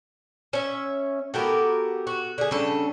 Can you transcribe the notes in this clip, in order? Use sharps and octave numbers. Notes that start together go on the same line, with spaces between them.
C#4 E5
B3 E4 F#4 G4 A4 A#4
F#4
D3 G#4
C#3 G3 C#4 D4 A4